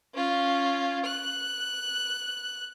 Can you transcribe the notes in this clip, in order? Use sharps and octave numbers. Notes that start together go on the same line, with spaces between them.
C#4 F4
F#6